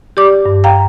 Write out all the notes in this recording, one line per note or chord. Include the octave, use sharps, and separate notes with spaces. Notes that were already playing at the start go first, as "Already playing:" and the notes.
G4 D5 D6
G2
F5 G5 A#5